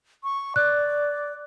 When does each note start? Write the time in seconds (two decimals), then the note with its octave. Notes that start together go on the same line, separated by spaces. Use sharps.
0.24 C#6
0.56 D5 F#6